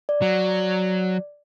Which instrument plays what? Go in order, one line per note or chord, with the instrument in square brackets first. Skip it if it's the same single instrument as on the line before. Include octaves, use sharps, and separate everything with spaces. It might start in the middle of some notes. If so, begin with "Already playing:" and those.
[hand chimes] D5
[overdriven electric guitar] F#3